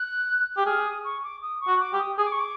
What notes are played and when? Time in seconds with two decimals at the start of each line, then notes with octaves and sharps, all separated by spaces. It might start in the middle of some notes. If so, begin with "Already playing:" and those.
Already playing: F#6
0.58 G4
0.66 G#4 F6
0.86 D#6
1.05 C#6
1.24 D6
1.42 D#6
1.61 C#6
1.68 F#4
1.80 D6
1.93 G4
1.99 D#6
2.18 G#4 D#6
2.25 D6
2.32 C#6
2.40 D6